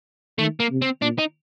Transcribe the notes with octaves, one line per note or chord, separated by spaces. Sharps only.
D#3 A3
A#3
C3
C4
A#2 D4
D#4